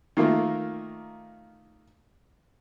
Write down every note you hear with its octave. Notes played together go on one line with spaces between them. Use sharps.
D#3 A3 A#3 F4